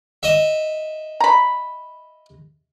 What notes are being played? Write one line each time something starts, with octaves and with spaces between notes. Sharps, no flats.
D#5 E5
A#5 B5